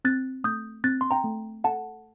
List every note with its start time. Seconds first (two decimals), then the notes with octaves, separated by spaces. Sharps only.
0.05 C4 F#6 A6
0.44 A3 D#6 G6
0.84 C4 F#6 A6
1.01 C6
1.11 G5 A#5
1.24 A3
1.64 A4 F#5 A5